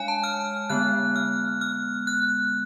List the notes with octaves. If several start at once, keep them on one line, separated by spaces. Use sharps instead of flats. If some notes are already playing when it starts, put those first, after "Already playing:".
Already playing: G#3 D4 C#5 F5 G#5
A5
F6
D3 G#3 B3 F#6
F6
F6
F#6